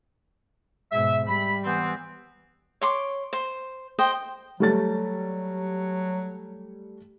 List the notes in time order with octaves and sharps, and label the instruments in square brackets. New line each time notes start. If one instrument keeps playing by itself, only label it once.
[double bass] G#2 B2 [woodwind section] E5
[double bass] G3 [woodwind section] B5
[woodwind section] E3 B3 C4
[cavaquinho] C#5 C6 D6
C5
C5 D#5 G5
[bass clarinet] F#3 [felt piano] G3 A3 A6